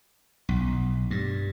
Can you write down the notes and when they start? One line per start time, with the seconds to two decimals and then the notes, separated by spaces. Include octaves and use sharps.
0.49 B1
1.11 G2